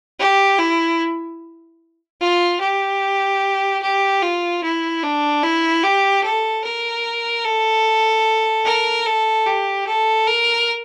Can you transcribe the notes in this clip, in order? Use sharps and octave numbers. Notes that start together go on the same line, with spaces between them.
G4
E4
F4
G4
G4
F4
E4
D4
E4
G4
A4
A#4
A4
A#4
A4
G4
A4
A#4